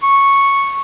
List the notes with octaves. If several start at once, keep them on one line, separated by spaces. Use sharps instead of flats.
C#6